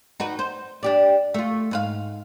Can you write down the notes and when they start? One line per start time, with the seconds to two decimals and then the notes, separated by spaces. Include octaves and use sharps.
0.20 D#4 F#4 B4
0.39 C5
0.83 D4 G4 D5
1.34 A3 F4
1.71 G#2 B4 F5